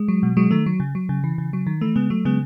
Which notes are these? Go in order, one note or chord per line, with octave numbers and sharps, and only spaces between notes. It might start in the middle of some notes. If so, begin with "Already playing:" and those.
Already playing: G#3
F#3
B2
F#3 G#3
D#3 A3
F#3
C#3
F#3
C#3
E3
C#3
F#3
D#3
E3 A3
C#3 G#3 B3
F#3 A3
C#3 G#3 B3